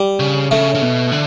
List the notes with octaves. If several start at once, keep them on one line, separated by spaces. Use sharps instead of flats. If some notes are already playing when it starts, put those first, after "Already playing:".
Already playing: G3
C#3
C#3 A3
C#3
B2
D3